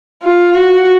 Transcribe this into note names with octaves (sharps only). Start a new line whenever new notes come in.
F4
F#4